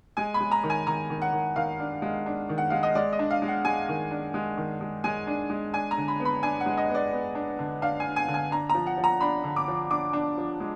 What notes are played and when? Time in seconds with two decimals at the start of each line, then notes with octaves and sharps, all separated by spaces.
0.17 G#3 G#5
0.34 B5
0.40 G#3
0.51 A#5
0.63 D#3
0.70 G#5
0.87 D#3 A#5
1.10 D#3
1.22 F#5
1.33 D#3
1.56 D#3 F5
1.80 D4
2.02 G#3
2.26 D4
2.49 D#3
2.58 F#5
2.70 G#3 F5
2.83 D#5
2.95 G#3 D5
3.13 D#5
3.19 D4
3.31 F5
3.42 G#3
3.48 F#5
3.65 G#3 G#5
3.89 D#3
4.11 D4
4.34 G#3
4.57 D#3
4.81 G#3
5.04 G#3 G#5
5.27 D4
5.50 G#3
5.73 D4 G#5
5.91 A#5
5.97 D3
6.08 B5
6.20 B3
6.25 B5
6.43 D4 G#5
6.60 F#5
6.66 G#3
6.78 D#5
6.90 B3 D5
7.13 B3
7.35 D4
7.59 D3
7.82 D4 F5
8.00 G#5
8.06 D4
8.16 G#5
8.28 D3
8.34 G#5
8.51 D4 A#5
8.70 F3 A#5
8.86 F#5
8.97 F3
9.04 A#5
9.21 D4 B5
9.44 D3
9.56 D6
9.68 F3
9.90 D4 D6
10.13 D4
10.37 F3
10.60 G#3